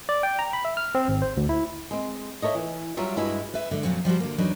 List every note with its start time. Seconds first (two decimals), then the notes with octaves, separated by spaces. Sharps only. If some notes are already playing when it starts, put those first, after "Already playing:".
0.09 D5
0.23 G5
0.39 A#5
0.53 B5
0.65 E5
0.77 F6
0.95 C4
1.08 G#1
1.22 C5
1.37 D2
1.49 E4
1.91 G#3 C4
2.42 E4 A4 C#5 D#5
2.55 E3
2.97 F#3 G3 F4 C#5 E5
3.16 G2 G#3 E4 F#4
3.54 B4 E5
3.71 D3 G#3
3.83 F2 A#2 F#3 C4 F4
4.05 F3 G3 F#4 C5
4.20 D3 A#3
4.38 E2 F#3 D4 D#4 B4